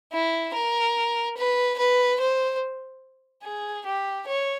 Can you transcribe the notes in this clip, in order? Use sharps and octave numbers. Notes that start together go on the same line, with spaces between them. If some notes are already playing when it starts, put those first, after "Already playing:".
E4
A#4
B4
B4
C5
G#4
G4
C#5